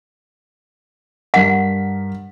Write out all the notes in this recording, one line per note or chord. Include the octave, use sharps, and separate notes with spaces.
G2 A#4 F#5 B6